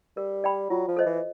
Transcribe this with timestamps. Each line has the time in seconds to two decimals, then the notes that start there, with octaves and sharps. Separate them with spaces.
0.17 G3 A#4
0.44 D5 G5 B5
0.70 F#3 F4
0.88 F3
0.97 A4 C5 D#5
1.06 E3